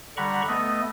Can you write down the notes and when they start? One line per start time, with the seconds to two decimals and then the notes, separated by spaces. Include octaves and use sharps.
0.17 D3 G3 F#5 A#5 B5 C#6
0.48 A3 B3 D#5